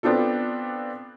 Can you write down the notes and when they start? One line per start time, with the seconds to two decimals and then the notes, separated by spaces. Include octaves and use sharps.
0.03 B3 C4 D4 F4 A4